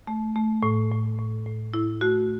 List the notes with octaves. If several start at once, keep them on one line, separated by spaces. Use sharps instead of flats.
A3
A3
A2
A2
A2
A2
A2 E4
A3 F#4